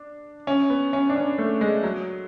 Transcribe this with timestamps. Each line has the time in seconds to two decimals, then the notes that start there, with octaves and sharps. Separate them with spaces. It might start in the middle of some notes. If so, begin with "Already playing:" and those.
Already playing: D4
0.47 C#4
0.70 B3
0.93 C#4
1.10 D4
1.16 C#4
1.38 A3
1.61 G#3
1.83 F#3